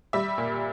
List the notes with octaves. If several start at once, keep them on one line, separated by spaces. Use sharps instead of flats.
G3 E5
A#2